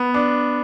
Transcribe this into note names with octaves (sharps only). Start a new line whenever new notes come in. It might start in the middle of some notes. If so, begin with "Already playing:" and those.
Already playing: B3
D4